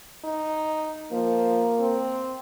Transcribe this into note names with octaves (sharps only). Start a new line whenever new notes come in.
D#4
F3 A#3
C4